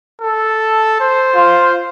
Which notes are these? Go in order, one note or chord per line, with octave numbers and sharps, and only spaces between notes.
A4
C5
F4